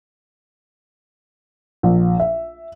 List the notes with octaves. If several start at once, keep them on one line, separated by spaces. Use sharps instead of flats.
A#1
E5